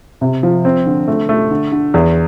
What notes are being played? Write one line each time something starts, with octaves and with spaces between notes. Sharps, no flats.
C3
F3
C4
D3
A3
A3
D3
D3
E2